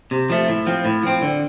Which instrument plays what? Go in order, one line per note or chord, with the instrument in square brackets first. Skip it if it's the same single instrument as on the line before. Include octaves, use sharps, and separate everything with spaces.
[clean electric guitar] C3
F3 A3
A2
F3 C4
A2
F3 C4
D3